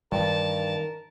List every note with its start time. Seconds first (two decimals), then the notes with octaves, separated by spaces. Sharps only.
0.12 G2 D#3 E3 G3 A#4 A5